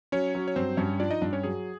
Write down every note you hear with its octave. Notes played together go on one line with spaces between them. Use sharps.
F#3 C#4 C#5
F#3
C#5
G2 C4 C5
G2 C#4 C#5
F3 D4 D5
D#4 D#5
G2 D4 D5
C#4 C#5
F#3 G#4